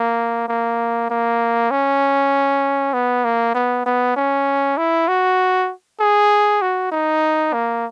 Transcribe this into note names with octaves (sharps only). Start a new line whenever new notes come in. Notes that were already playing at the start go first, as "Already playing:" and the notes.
Already playing: A#3
A#3
A#3
C#4
B3
A#3
B3
B3
C#4
E4
F#4
G#4
F#4
D#4
A#3